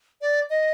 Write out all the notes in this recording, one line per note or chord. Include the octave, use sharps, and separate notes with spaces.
D5
D#5